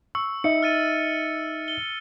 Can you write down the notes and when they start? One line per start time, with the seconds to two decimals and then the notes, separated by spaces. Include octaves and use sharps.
0.15 C#6 E6
0.44 D#4 D#5 E5 C#7
0.63 F6 A6 D#7
1.68 G7